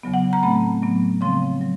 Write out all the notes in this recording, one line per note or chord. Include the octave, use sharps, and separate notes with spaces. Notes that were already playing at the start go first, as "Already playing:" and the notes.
E2 C#3 F#3 B3
F#5
A#5
A2 F#3 A3 C4 B5
A2 F#3 B3
C#3 F3 G#3 C4 C6
F#3